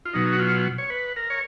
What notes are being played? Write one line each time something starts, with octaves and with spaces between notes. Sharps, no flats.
F4
B2 F#3 D#4
F#4
F4
C#5
B4
A#4
C#5